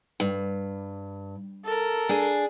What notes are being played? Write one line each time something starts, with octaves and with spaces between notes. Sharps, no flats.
G2
A4 A#4
D4 G#4